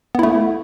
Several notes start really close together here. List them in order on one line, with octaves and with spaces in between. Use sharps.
B3 E4 A3